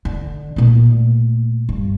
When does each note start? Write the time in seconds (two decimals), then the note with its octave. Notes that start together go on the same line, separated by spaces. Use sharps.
0.05 D3
0.56 A#2 A3
1.69 G2